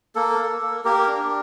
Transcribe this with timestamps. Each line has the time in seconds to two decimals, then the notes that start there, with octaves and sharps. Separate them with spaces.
0.15 A#3 A4
0.39 A#3
0.62 A#3
0.85 A#3 G4 A#4
1.07 D4